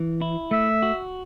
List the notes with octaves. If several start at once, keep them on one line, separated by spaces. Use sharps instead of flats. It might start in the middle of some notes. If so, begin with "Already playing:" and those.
Already playing: E3
E4
A3 E5
F#4